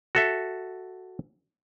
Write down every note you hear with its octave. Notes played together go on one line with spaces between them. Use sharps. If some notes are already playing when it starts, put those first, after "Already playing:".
F#4 A4 E5